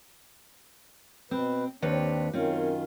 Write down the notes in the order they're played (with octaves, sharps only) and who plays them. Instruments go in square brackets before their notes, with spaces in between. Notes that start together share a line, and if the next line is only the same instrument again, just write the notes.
[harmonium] B2 B4 [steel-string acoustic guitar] C4
[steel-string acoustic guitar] D#2 B4 C#5 [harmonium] C4 D4
[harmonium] F#2 D#3 F4 [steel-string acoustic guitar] C4 C#4